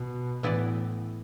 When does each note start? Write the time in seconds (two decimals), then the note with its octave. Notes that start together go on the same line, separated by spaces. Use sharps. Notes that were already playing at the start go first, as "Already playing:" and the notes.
Already playing: B2
0.43 A2 E3 B3 E4 B4 D5